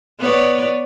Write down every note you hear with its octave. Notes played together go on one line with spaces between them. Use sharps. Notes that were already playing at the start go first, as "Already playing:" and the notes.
B3 C#5 D5